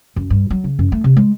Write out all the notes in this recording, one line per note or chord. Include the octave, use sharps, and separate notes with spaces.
F#2
G2
F#3
C#3
F#2
A3
C3
G#3